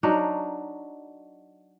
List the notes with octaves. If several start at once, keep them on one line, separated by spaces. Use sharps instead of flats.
F#3 D4 D#4